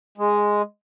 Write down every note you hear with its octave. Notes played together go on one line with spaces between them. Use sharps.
G#3